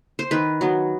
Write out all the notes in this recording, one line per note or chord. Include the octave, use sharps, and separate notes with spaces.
C5
D#3 B4
F#3 B3